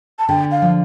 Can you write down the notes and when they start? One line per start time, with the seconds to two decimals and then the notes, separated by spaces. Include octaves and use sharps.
0.19 A5
0.29 D3 G5
0.51 F5
0.62 F3